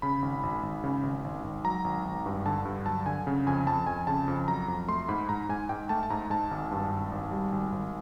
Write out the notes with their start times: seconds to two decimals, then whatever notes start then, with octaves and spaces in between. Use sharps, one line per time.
0.02 C#3 B5
0.22 G#1
0.43 G#1
0.63 G#1
0.84 C#3
1.03 G#1
1.24 G#1
1.44 G#1
1.64 F#3 A#5
1.84 G#1
2.05 G#1
2.26 G2
2.46 D3 A5
2.65 G2
2.86 F#3 A5
3.06 D3 G#5
3.27 C#3
3.46 F2 G#5
3.67 F2 A5
3.87 F2 G#5
4.07 C#3 A5
4.28 F2
4.48 F#3 A#5
4.68 F2
4.88 A3 C6
5.08 G#2 B5
5.29 G#2 A#5
5.49 G#2 G#5
5.69 G#2 G5
5.89 A3 A5
6.03 A5
6.10 G#2 A#5
6.30 G#2 A5
6.51 G#1
6.71 G2
6.92 G#1
7.12 G#1
7.31 G3
7.52 G#1
7.72 G#1